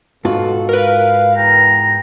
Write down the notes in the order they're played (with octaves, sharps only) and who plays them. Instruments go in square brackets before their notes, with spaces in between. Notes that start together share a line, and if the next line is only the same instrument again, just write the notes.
[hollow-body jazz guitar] G#2 F4 F#4 [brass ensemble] B2 A4
[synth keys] A#4 B4 [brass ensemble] F5
[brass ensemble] E2 G5 [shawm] A#5